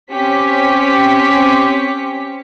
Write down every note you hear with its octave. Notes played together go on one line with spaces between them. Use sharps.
C4 C#4 G4 C#5 B6 C#7